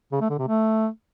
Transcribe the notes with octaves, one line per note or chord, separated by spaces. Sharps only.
C#3
A3
D3
C3
A3